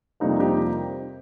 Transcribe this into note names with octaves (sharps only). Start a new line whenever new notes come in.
F2 C3 G3 A#3 D#4
D#4 G4